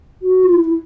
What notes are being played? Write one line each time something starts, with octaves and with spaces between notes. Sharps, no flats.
F#4
F4
E4
E4